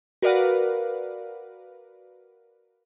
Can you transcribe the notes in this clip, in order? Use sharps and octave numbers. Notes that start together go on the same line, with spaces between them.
F#4 A#4 B4 D5 F5 F#5